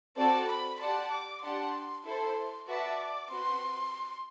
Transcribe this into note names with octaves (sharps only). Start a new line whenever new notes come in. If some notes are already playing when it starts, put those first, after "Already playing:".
C4 F#4 A4 D5 A5
B5
G4 D5 F#5 A5 C6
D6
D4 G4 D5 F#5 A5 C6
E4 A4 C5 C6
F#4 B4 D5 E5 A5
C4 F#4 B4 C6